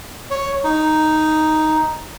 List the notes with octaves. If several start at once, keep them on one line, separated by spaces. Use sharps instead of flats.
C#5
D#4